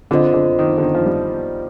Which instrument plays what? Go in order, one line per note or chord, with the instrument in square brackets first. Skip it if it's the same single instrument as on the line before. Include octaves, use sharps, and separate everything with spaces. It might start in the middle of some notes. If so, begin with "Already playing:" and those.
[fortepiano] D3 [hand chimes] C4 F4 C5 D#5
[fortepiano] D3
D#3
D3
D#3
F3
G3